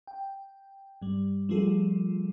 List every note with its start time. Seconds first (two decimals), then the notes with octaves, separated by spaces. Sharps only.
0.07 G5
1.02 G2 G3
1.49 F3 G3 A3 F4 G#4 A4